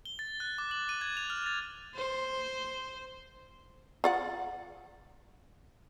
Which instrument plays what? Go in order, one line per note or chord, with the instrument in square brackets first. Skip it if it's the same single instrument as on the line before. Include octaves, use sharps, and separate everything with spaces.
[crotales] G7
A6
F#6
D6
F#7
D#7
G#6
F7
F6
A6
[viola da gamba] C5
[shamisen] F4 D5 F#5